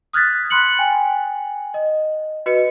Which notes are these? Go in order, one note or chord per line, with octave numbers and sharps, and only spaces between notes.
D#6 F6 F#6 G#6 A6 B6
B5 C6 F#6 C#7 F#7
G5 G#5
D#5
F#4 B4 D#5 C#7